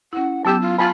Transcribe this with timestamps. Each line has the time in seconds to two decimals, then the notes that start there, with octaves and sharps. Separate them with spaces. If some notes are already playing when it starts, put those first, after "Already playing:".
0.13 C#4 E4 F#5
0.45 F#3 B3 G4 A5 E6 G6
0.60 F4
0.79 F4 G#5 A5 B5